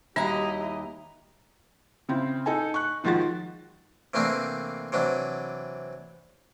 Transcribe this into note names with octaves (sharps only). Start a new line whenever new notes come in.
D#2 G3 E4 F#4 G4 D#5 A#5
C#3 C4 E4
D#4 A4 G#5
C#6 F#6
D#3 F3 G#3 F4 F#4 A6
C3 E3 A3 A#3 C4 D4
C3 E3 F#3 D4